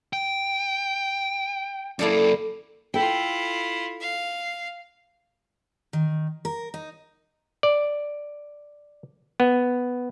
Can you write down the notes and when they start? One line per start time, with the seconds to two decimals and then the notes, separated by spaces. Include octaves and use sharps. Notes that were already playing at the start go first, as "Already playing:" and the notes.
0.13 G5
1.99 F#2 A#3 E4 A4 D5
2.94 E4 F4 A4 G5
4.01 F5
5.93 D#3
6.45 A#4
6.74 D#4
7.63 D5
9.40 B3